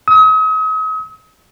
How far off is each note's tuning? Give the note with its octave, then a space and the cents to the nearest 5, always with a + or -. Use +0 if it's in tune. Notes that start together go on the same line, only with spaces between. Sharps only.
D#6 +40